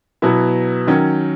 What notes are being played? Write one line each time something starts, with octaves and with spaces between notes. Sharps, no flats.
B2 F#3 B3 E4
D#3 F#3 C#4